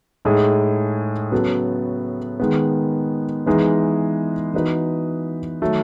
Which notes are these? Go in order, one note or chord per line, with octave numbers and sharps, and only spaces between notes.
A2 G#3 D#4 G#4
C#3 F#3 B3 F#4 A4
D#3 G#3 B3
E3 G#3 B3 D#4
E3 B3 D#4 F#4 B4
D#3 F#3 A3